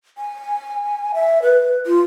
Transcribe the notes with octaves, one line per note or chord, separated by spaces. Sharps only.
G#5
E5
B4
F4